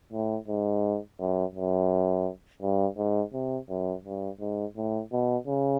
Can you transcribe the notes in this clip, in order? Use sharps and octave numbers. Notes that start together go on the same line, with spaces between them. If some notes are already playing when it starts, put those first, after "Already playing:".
A2
G#2
F#2
F#2
G2
G#2
C3
F#2
G2
G#2
A2
B2
C#3